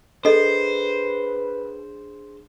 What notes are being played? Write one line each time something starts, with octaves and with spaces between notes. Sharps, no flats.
D4 G#4 A4 B4 C5 D#5